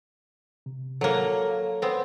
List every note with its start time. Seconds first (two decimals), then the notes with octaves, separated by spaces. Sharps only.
0.66 C3
1.01 F#3 A#3 A4 C#5
1.82 B3 C4